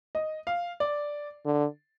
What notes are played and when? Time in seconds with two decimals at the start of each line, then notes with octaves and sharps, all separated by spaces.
0.15 D#5
0.47 F5
0.80 D5
1.45 D3